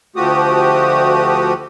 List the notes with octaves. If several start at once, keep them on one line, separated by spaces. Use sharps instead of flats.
D2 F3 A3 F#4 G4 D#6